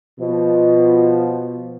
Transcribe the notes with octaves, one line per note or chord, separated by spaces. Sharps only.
B2 F3